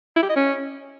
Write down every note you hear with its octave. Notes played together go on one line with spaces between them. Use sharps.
E4
G4
D#5
C#4